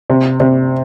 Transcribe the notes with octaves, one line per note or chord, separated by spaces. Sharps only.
C3
C3